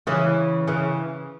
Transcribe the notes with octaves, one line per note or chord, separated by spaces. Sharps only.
C#3 E3
C#3 E3